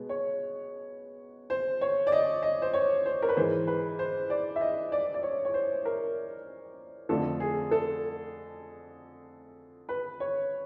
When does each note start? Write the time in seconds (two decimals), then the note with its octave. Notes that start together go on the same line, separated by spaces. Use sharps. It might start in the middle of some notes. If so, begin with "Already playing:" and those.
Already playing: B2 G#3 B3
0.09 C#5
1.50 C5
1.81 C#5
2.07 D5
2.12 D#5
2.42 D#5
2.62 C5
2.73 C#5
3.06 C5
3.22 A#4
3.29 B4
3.37 G#2 E3 G#3 C5
3.67 B4
3.99 C5
4.30 D5
4.56 E5
4.61 D#5
4.92 D5
5.14 D5
5.23 C#5
5.45 C#5
5.54 C5
5.85 A#4
7.09 F2 D3 F3 A3 A4
7.40 G#4
7.71 A4
9.89 B4
10.20 C#5